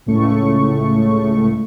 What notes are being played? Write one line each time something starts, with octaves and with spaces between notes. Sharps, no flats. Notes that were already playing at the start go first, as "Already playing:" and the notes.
C#2 A2 C#3 A3 C#6